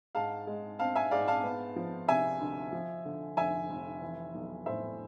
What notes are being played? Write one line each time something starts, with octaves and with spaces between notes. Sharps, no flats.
G#2 F5 A5
G#3
C4 F5 A5
E5 G#5
G#2 D5 F5
F5 A5
B3
F3
C3 E5 G#5
D2
F3
D3
F1 E5 G#5
F1
E3
B1
A2 C5 E5